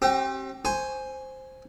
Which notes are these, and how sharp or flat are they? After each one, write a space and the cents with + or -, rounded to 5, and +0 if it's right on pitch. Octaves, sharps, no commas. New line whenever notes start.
C4 +35 G4 -30
C5 +0 G#5 +0 C#6 +0